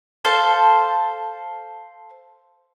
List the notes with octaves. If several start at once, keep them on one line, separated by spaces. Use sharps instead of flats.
A4 C5 F5 A5